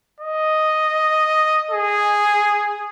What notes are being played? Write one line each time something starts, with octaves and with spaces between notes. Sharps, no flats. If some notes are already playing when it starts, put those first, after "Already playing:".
D#5
G#4